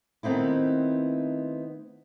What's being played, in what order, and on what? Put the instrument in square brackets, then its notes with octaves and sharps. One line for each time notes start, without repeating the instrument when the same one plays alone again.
[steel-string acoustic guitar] D#3 A3 B3 C4 D#4 E4